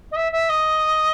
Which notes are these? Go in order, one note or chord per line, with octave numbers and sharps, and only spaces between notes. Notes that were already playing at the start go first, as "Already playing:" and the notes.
D#5
E5
E5
D#5